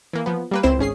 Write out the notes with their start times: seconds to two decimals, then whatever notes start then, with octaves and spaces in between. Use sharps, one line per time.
0.13 E3 A#3
0.26 F3 B3
0.51 G3 A#3 B4
0.63 C#2 C4 E4 C5 E7
0.79 G#1 C#4 G#4 C7